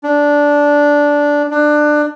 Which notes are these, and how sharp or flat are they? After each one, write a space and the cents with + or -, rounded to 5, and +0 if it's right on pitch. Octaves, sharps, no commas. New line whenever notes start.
D4 -10
D4 +20